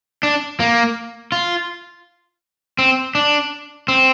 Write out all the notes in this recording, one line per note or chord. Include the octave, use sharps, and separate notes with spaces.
D4
A#3
F4
C4
D4
C4